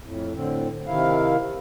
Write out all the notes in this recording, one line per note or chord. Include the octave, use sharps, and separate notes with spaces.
F2 A2
A2 D3 C4
C3 D#3 E4 F5